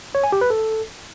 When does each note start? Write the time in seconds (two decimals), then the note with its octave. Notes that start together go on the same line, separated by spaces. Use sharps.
0.15 C#5
0.24 G#5
0.32 G4
0.41 B4
0.50 A4